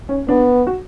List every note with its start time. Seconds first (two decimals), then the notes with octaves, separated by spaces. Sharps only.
0.09 C#4
0.29 B3 D4
0.67 F#4